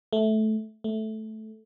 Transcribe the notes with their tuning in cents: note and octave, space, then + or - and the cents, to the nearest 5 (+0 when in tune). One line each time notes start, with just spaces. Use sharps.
A3 -15
A3 -10